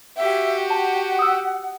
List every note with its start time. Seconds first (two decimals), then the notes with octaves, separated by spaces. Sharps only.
0.17 F#4 G4 E5
0.70 F#5 A5
1.19 D#6 E6